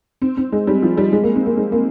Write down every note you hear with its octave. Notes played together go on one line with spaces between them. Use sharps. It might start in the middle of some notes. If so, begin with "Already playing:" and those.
C4
C4
G#3
G3
F3
G3
G#3
A#3
C4
A#3
G#3
A#3